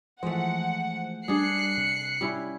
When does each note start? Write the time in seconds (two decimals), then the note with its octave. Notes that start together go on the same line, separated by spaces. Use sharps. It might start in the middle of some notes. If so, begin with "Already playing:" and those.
0.23 E3 F3 G#3 A3 C5 F#5
1.28 G3 D4 G#4 F#6 C7 C#7
1.78 C3
2.21 G3 C#4 E4